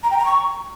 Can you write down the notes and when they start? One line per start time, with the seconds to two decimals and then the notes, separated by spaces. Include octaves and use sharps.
0.03 A#5
0.11 G5
0.18 A#5
0.25 C#6